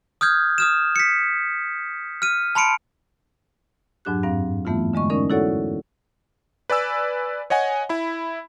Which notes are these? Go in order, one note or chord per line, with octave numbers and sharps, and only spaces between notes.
D#6 F6 G6 G#6
D#6 F6 E7
B6 C#7
F6 D#7
A5 B5 C6 C#7 D7
F2 G#2 F#3 D4 G4 F#6
G2 C4 F5
E3 A3 B3 E4 F4
D3 G#3 D#5 C#6
C#4 D#4 A#4 D5
E4 F#4 A4 C#5 D5 F#5
B4 D5 G#5 E6
C#5 D#5 F#5 G#5
E4 B5